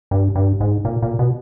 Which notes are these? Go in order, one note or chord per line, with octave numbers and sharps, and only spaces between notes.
G2
G2
G#2
A#2
A#2
B2